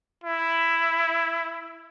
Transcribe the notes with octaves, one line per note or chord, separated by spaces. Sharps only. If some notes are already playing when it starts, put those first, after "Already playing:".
E4